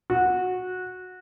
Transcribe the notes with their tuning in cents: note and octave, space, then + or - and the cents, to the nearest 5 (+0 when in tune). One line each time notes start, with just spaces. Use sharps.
F#4 -15